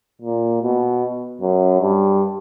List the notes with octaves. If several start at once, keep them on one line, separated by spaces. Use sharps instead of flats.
A#2
B2
F#2
G2